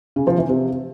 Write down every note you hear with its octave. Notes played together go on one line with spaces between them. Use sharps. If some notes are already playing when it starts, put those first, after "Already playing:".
C#3
F3
E3
C3